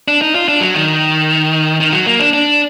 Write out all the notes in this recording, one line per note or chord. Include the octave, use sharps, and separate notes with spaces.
D4
D#4
F4
D4
F#3
D#3
D#3
F#3
A#3
D4
D4